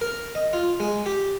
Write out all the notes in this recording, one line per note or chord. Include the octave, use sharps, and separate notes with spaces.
A#4
D#5
F4
G#3
G4